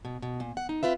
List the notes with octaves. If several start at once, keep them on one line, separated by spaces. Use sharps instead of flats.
B2
B2
A#2
F#5
D#4
C4 F4 B4 E5